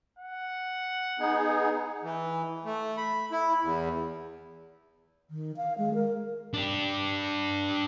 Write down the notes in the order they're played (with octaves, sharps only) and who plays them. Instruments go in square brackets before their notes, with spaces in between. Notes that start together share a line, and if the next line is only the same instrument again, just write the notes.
[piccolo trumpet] F#5
[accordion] B3 D#4 G#4
E3
A3
B5
E4
E2
[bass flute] D#3
F5
G#3
A#4
[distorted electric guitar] D4 G4